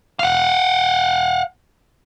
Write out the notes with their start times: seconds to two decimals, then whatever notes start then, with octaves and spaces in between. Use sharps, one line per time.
0.19 F5 F#5